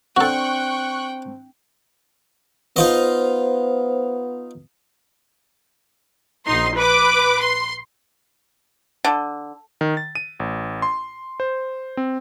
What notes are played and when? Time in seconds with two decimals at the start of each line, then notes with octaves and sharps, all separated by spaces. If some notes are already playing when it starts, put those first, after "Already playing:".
0.17 C4 D4 F#4 A4 G5 C#6 F#6
2.76 B3 D#4 F4 C5 D#5
6.46 A#1 D#4 C6
6.76 B4 D6
7.41 C6
9.05 D3
9.81 D#3
9.97 A6
10.15 D#7
10.40 A1
10.82 C6
11.40 C5
11.97 C4